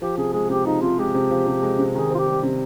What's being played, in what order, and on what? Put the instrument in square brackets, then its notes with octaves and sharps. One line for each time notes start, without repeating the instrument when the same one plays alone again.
[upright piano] F3 [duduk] G4
[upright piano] C3 [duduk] G#4
[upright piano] G#3 [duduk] G#4
[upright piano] C3 [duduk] G4
[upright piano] F3 [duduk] D#4
[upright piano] C3 [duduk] F4
[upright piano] G#3 [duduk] G4
[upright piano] C3
F3
C3
G#3
C3
[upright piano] D#3 [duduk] G#4
[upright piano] C4 [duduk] F4
[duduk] G4
[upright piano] G3
C3